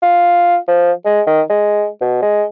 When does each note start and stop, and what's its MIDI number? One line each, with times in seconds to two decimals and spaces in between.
0.02 0.57 65
0.68 0.92 53
1.05 1.22 56
1.27 1.42 51
1.49 1.88 56
2.01 2.18 47
2.22 2.45 56